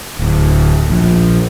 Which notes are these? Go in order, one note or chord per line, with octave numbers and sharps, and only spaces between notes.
D1
A#1